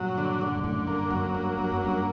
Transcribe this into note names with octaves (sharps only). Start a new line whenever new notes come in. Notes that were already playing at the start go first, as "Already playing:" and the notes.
Already playing: G2 A#2 F#3
D3
D3
G2
F#2 A2 D3
G2 A#3
F#2 F#3
G2 A#3
G2 F#3
F#2
G2 A#3